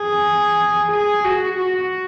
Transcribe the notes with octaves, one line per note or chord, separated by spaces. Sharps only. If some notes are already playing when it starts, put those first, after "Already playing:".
Already playing: G#4
G#4
F#4
F#4